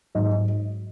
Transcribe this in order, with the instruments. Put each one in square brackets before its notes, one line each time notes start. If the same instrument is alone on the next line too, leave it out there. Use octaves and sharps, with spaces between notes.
[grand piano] G#2 F#3 D#5